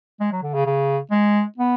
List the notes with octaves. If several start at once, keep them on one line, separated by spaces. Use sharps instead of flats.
G#3
F#3
D3
C#3
C#3
G#3
B3